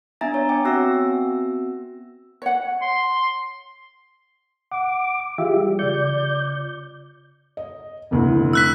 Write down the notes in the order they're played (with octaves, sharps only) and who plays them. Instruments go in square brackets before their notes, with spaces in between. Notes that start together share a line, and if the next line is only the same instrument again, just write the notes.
[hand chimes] B3 D4 E5 G#5 A#5 A6
C#5
G5 G#5 D6
B3 C4 F#4 E5 E6 A#6
[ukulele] C#5 F#5
[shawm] C6
[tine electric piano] F#5 [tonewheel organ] D6
[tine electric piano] E3 G#4 [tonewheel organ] F4 G4 E5
[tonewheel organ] G3
[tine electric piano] C#3 F4 C#7 [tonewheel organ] D5 G6
[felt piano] D#5
F1 D2 E4
[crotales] E6 F#6 B6